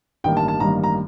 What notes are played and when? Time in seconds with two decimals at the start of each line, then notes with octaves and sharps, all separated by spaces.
0.24 A1 G2 D#3 G3 A#3 G5
0.37 A5
0.48 A5
0.60 A1 G2 D#3 G3 A#3 A#5
0.83 A#5